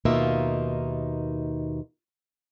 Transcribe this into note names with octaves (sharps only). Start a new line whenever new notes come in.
D#2 B2 A#3 D#4 F4 E5